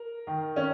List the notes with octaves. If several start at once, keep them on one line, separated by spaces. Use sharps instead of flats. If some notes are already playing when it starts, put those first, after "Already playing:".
Already playing: A#4
D#3
C#4